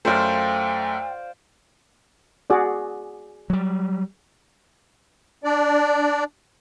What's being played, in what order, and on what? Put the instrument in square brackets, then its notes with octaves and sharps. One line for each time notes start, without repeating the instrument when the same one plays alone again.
[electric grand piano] F#2 A3 [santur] C5 D5 F5 [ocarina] G5
[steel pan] F#4 G#4 D5
[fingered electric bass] F#3 G3
[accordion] D4 D5